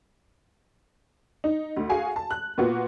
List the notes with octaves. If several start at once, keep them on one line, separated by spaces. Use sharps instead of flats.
D#4
D2
F#4 G#4 F5 G#5
A5
F#6
A#2 A#3 B3 F4 F#4